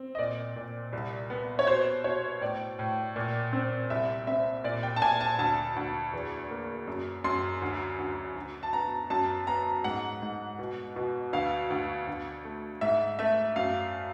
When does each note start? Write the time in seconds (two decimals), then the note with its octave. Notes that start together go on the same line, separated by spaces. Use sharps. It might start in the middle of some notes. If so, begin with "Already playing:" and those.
Already playing: C4
0.15 D#5
0.18 A#2 D5
0.56 A#2
0.93 C2
1.30 B3
1.59 C#5
1.67 B2 C5
2.04 B2 C#5
2.41 A2 D5
2.79 A2
3.16 A#2
3.53 C4
3.90 C2 E5
4.27 C4 E5
4.64 A#2 D5
4.83 G5
4.96 A5
5.02 A#2 G#5
5.21 A5
5.39 D2 A5
5.76 D2
6.13 E2
6.50 A#3
6.88 F#2
7.24 F#2 C6
7.62 D2
7.99 D2
8.36 D2
8.63 A5
8.73 B3 A#5
9.10 F#2 A5
9.47 B3 A#5
9.84 G#2 F#5
10.22 G#2
10.59 B2
10.96 B2
11.33 D2 F5
11.70 D2
12.07 D2
12.44 A3
12.81 G#2 E5
13.19 A3 E5
13.56 F#2 F5